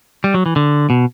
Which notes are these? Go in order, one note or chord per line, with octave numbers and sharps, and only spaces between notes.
G3
F#3
E3
D3
B2